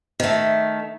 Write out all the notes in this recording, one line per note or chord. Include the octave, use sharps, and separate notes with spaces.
D#3 A3